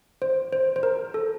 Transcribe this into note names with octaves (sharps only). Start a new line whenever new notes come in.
C5
C5
C5
A#4
A4